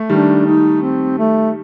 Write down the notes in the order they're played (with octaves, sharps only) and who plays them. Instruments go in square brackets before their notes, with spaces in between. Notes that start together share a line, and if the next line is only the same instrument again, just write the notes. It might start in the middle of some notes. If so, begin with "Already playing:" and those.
Already playing: [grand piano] A3
[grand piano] D#3 G3 [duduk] D4
[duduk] D#4
C4
A3